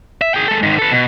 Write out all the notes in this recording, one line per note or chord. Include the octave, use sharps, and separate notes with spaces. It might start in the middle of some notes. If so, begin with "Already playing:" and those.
E5
G#4 G5
G#3 A4
G#2 D#3
A4 B4
B2